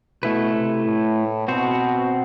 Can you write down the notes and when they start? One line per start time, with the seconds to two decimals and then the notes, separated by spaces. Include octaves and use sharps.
0.22 B2 A3 E4 B4
0.53 C3
0.85 A2
1.48 B2 C4 F#4 C5